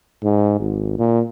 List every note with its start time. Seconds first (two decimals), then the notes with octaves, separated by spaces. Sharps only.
0.23 G#2
0.60 G#1
0.98 A#2